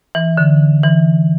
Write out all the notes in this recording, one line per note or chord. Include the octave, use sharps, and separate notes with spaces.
E3
D3
E3